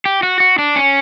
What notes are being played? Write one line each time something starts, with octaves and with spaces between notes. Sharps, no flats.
G4
F#4
F#4
D4
C#4